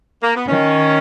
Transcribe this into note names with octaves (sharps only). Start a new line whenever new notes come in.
A#3
B3
D#3 C#4